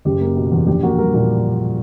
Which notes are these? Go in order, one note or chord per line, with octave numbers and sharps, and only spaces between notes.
F#1 G4
A#3
B2
E2
A#1 G4
A#3 F#4
G4
G3 A#4
A#2 A#4